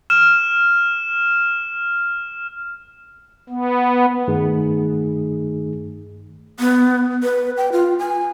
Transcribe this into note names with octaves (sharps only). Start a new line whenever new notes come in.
F6 E7
B3
G2 D#3 A3 D#4 G#4
B3
B4
G5
F4
G#5